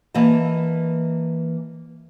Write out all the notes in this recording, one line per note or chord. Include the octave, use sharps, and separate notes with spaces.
E3 A#3 D#5 A5